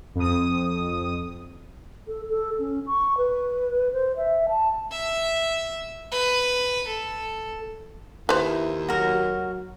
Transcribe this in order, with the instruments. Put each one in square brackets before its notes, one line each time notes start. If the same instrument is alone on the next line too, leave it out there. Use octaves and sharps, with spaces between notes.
[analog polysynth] F2 D#6
[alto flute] A4
A4
C#4
C#6
B4
C5
E5
A5
[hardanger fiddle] E5
B4
A4
[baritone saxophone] D#2 [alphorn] E4 [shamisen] B4 C5
[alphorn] F#3 [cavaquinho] F#4 A#4